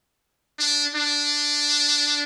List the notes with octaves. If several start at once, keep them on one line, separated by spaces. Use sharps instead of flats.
D4
D4